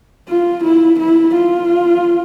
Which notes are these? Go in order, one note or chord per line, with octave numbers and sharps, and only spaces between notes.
F4
E4
E4
F4